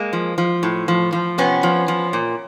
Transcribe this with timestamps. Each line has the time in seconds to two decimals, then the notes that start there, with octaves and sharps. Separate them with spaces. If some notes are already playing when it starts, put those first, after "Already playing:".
Already playing: G#3 A#3
0.13 F3
0.38 F3
0.63 A2
0.88 F3
1.13 F3
1.38 C3 B3 C#4
1.63 F3
1.88 F3
2.13 A#2